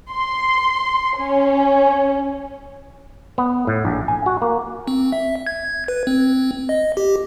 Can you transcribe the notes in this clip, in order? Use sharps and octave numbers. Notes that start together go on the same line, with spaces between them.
C6
C#4
B3
A2
A#1
G#5
F#4
A#3
C4
E5
G#6
B4
C4
D#5
G4